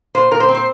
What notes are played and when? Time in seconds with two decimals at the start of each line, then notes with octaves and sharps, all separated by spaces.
0.15 A#2 C5
0.31 A#2 A#4
0.40 C5
0.49 C4
0.55 C5